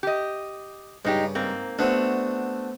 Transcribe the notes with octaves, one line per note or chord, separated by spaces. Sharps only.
G4 D#5
G2 C#3 G#3 D#4 G4
G#2 A#3 C4
A3 B3 C4 D4 F#4